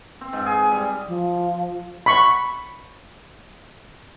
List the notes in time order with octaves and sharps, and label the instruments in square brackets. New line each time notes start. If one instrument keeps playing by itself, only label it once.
[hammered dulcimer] C4
G#2
G#4
G3
[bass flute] F3
[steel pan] B5 C#6